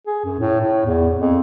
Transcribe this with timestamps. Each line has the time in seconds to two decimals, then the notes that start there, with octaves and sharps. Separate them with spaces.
0.06 G#4
0.25 F#2
0.39 A2
0.60 A2
0.86 E2
1.19 F2